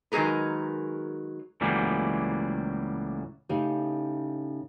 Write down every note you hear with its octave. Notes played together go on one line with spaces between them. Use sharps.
D#3 F#3 G#3 G#4 A#4 B4
C#2 A2 E3 F#3 G3 A#3
A2 C#3 D#4 G4